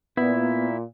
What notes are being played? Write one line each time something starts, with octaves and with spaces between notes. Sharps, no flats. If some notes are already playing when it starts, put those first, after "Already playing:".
A#2 B3 E4